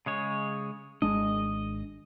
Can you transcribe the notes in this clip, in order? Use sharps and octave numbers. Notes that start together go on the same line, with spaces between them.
C#3 G#3 C#5
G#1 G#3 D4 D#5